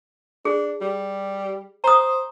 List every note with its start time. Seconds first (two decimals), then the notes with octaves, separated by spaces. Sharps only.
0.45 D4 G#4
0.81 G3
1.84 C5 A#5 D#6